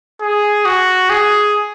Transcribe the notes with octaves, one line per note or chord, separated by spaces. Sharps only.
G#4
F#4
G#4